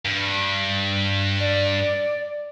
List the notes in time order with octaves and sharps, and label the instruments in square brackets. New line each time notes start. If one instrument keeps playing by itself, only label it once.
[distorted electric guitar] G2
[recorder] D5